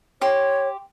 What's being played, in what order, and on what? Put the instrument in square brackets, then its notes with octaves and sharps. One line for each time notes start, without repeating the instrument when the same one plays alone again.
[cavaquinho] G4 C6 [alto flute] C#5